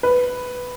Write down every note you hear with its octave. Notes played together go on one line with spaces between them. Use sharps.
B4